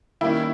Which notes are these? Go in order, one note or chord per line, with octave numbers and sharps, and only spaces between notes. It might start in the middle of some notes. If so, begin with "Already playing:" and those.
D#3 G3 A#3 C#4 E4